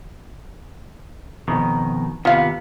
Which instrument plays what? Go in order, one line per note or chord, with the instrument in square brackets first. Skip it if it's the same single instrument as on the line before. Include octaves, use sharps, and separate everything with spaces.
[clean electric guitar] F2 B2 D#3
[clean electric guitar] D#2 C3 B3 [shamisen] F4 F5